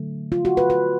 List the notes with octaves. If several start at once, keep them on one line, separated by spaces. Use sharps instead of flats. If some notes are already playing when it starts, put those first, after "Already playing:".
Already playing: D3 F#3 A3
F4
F#4
B4
B4